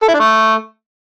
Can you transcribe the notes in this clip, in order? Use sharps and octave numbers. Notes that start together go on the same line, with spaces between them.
A4
E4
D4
A3